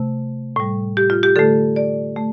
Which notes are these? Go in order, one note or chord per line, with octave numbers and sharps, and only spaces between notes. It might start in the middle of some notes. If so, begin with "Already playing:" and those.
Already playing: C3 A3
A2 G3
G4
F4
G4
D3 A3 A4
D5
A3